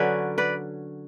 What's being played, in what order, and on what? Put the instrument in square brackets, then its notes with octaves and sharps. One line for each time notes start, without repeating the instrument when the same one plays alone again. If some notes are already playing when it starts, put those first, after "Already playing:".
Already playing: [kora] D3 F#3 C#4 B4 D5
B4 D5